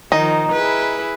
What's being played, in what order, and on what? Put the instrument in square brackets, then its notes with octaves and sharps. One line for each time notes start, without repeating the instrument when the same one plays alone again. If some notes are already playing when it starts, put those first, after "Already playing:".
[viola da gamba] D#3 F3 [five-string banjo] D#4
[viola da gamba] E4 G#4 B4